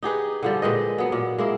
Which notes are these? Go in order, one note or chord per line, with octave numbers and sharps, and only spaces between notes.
D#4 G4 G#4 B4
D3 F3 G3
A#2 G#3 B4 D#5
F#3 B3
A#2
G#3 A#3 E4